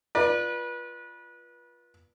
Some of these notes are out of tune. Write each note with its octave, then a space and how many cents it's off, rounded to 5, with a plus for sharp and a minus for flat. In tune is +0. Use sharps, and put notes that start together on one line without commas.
F4 +0 B4 -30 D5 +20